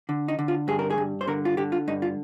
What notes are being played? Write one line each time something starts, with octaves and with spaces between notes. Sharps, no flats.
D3
D#4
D3
F4
G2 G#4
A#4
G#4
G2
C5
D3 A#4
F4
D3 G4
F4
G2 D#4
F4